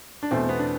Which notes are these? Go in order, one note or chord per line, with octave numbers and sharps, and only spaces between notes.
D4
E2 B2 A3 C4
B3
D4